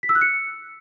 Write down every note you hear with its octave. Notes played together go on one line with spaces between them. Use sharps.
B6
E6
F#6
C#7